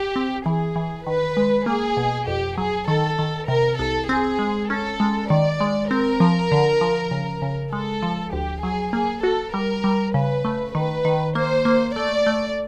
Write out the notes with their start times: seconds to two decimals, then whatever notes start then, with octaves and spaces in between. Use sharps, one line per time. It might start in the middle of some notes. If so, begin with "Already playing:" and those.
Already playing: G4
0.16 C4
0.46 E3 G#4
0.76 E3
1.06 D#3 B4
1.37 G#3
1.66 A#3 G#4
1.97 B2
2.27 F2 G4
2.58 F#3 G#4
2.88 D#3 A4
3.19 D#3
3.48 C3 A#4
3.78 C2 A4
4.09 C4 G#4
4.39 G#3
4.70 C#4 A4
5.00 G#3
5.30 D#3 D5
5.60 G#3
5.91 C4 A#4
6.20 F3
6.52 D3
6.81 F3
7.11 C#3
7.42 C#3
7.72 G#3 A4
8.03 F3
8.33 D2 G4
8.63 F#3 G#4
8.93 A#3 G#4
9.23 F#4 A4
9.54 G3 A#4
9.84 G3
10.14 C#3 B4
10.45 A3
10.74 D#3 B4
11.05 D#3
11.35 A#3 C5
11.65 A#3
11.96 A3 D5
12.26 A3